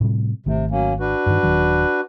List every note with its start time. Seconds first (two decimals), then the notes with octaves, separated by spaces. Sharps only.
0.01 A2 C3 G3
0.46 G#1 C3 D#3 A3
0.71 F#3 A#3 C#4
1.00 D4 F#4 B4
1.26 G2 D#3
1.43 D#1 D#3 F#3